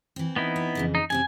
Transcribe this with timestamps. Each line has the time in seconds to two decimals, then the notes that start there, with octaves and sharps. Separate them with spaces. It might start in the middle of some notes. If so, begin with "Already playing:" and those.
0.16 E3 C4
0.36 B3 D#4 E4
0.56 C4
0.75 F2 C#3 E3
0.95 D#4
1.10 F#2 C3 C4 G#5